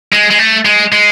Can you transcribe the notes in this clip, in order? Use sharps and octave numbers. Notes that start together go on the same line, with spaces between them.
G#3
G#3
A3
G#3
G#3